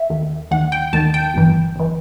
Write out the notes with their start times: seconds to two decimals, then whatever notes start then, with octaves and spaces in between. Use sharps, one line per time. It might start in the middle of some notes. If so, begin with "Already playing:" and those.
Already playing: E5
0.10 D#2 D#3
0.51 D#2 D#3 F#5
0.72 G5
0.93 D#2 D#3 A5
1.14 G5
1.34 G1 G2 E3
1.76 G1 E3